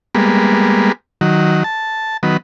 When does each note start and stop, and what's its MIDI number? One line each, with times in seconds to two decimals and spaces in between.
0.15 0.92 55
0.15 0.92 56
0.15 0.92 58
0.15 0.92 59
1.21 1.63 51
1.21 1.63 54
1.64 2.17 81
2.23 2.37 51
2.23 2.37 54
2.23 2.37 59